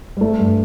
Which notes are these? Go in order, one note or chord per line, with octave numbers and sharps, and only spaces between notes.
G3
A3
G2